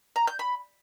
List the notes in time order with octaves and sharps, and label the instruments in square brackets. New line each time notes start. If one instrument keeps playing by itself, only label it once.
[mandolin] A#5
G6
B5